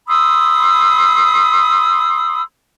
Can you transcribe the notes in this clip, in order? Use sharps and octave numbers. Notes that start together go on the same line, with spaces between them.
B5 C6 D#6 E6